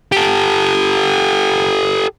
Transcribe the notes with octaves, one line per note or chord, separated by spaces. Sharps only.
G4 A4